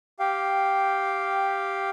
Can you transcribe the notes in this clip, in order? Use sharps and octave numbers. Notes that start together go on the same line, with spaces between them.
G4 F5 G5